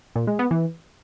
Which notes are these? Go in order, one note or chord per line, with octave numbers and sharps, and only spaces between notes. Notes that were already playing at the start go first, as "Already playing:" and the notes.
A#2
G#3
B3
E3